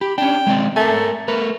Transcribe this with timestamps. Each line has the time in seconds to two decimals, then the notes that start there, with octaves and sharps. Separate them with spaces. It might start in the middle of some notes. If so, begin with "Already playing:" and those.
0.01 G4 B5
0.18 C#4 D4 G5
0.47 G#3 C4 D5
0.76 A3 A#4 G#5
1.28 A3 A#4 B4